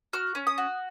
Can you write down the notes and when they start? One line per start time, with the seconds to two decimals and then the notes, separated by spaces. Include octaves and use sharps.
0.13 F#4 F6
0.35 C#4
0.47 D#6
0.58 F#4